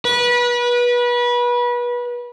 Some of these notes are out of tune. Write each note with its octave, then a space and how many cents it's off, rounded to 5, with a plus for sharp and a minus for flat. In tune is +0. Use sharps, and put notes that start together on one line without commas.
B4 -30